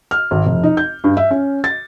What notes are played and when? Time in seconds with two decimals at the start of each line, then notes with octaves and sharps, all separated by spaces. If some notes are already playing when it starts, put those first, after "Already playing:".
0.11 F6
0.31 G#1
0.46 F1
0.63 D#4
0.77 G6
1.04 G2
1.17 E5
1.31 C#4
1.64 A6